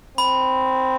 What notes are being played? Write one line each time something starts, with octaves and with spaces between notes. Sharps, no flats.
C4 B5